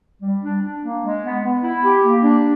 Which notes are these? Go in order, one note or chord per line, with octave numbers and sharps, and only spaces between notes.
G3
D4
D4
A#3
G#3
B3
B3
E4
G4
A#3
D4